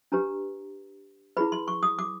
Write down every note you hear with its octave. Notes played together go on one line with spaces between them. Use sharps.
D4 G4 B4 A#5
E4 G#4 B4 B5
C6
C#6
D#6
D6